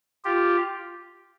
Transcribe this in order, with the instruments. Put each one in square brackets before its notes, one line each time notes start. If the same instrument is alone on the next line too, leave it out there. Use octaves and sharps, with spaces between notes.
[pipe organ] F4 G4